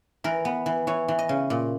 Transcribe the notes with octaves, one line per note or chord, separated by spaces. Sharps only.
E3 A#4
B3
E3
E3 C#5
E3
D#5
C#3
A#2